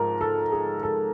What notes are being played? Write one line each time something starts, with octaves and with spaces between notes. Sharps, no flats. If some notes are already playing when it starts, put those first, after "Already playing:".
Already playing: G#2 F3 A#4
A4
G#4
A4